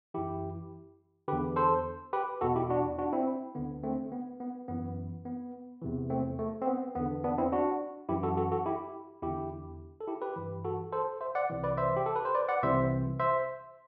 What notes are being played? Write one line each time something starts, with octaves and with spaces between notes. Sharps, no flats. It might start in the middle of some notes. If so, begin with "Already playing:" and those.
F#2 E3 E4 G4
E2 D3 G4 B4
A4 C5
G4 B4
E2 B2 F#4 A4
E4 G4
D4 F#4
D4 F#4
C4 E4
D2 D3 B3
A3 C4
B3
B3
F#2 E3 B3
B3
E2 C3 E3
A3 C4
A3
C4
B3
E2 D3 B3
B3 D4
C4 E4
D4 F#4
F#2 E3 E4 G4
F#4 A4
F#4 A4
F#4 A4
E4 G4
E2 D3 E4 G4
A4
E4 G4
G4 B4
G2 E3
F#4 A4
A4 C5
C5 E5
D5 F#5
C2 C3 E3
B4 D5
C5 E5
G4
A4
B4
C5
B4 D5
D5 F#5
C2 C3 E3 C5 E5
C5 E5